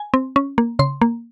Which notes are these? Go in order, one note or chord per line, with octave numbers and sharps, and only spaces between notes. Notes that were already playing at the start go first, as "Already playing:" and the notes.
Already playing: G#5
C4
C#4
A#3
C#3 C6
A#3